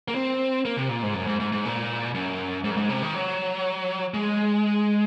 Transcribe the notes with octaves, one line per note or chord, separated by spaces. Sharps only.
A#3
C4
A#3
C3
A#2
G#2
F#2
G#2
G#2
G#2
A#2
F#2
G#2
F#2
G#2
C3
D#3
F#3
G#3